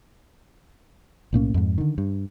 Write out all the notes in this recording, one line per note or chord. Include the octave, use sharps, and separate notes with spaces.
B1 A2 A#3 C#4
F2 G#2
D3 D#3
G2